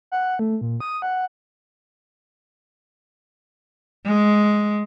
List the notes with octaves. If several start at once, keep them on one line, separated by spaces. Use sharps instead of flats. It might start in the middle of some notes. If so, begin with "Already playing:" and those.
F#5
A3
A#2
D#6
F#5
G#3